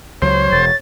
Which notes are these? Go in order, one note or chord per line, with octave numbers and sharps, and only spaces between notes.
C#2 F#3 C5 C#5
E1 A6